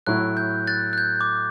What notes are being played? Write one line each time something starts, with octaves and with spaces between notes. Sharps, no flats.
A2 F#3 A3 E4 F#6
G6
F#6 A6
F#6
G6
D6